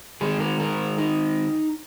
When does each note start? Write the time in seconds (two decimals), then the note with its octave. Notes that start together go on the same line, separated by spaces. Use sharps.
0.21 D#3 G#3 G#4
0.40 A#4
0.60 A#4
0.98 D#4